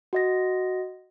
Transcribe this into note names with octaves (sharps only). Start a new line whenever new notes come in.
F#4 D#5 A#6